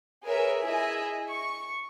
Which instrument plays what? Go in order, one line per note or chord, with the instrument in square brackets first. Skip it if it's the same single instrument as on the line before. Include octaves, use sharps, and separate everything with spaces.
[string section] G#4 A#4 B4 C#5 E5
E4 G#4 D#5 E5
C#6